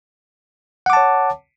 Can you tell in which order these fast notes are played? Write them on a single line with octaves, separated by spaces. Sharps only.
F#5 D6 A5 C#5